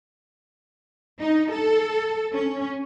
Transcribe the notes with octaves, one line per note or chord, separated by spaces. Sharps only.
D#4
A4
C#4